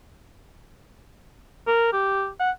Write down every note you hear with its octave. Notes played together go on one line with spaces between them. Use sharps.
A#4
G4
F#5